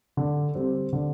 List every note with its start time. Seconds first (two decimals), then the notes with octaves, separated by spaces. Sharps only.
0.17 D3
0.55 G3 C4
0.93 D3